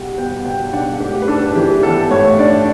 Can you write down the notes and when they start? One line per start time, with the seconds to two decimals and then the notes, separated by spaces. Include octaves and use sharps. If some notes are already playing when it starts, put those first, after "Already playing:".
Already playing: B2 G3 F#5
0.18 B3 G5
0.45 B2 G5
0.73 D4 F#5
1.00 A2 G4
1.22 B4
1.28 D4 A4
1.55 E3 G4
1.83 B3 A4
2.11 A2 C#5
2.39 D4 D5